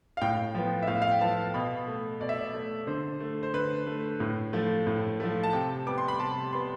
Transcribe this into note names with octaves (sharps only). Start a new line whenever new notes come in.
F5
A2 G5
F3 B3
E5
A2 F5
F5
G5
F3 B3 A5
B2 B5
A3
B2 D5
E5
D5
A3
D3 C5
A3
C5
D3 B4
A3
A2
F3 A3
A2
F3 A3
A5
C3 G5
G3 B3 D6
C6
B5
C3 A5
G3 B3 C6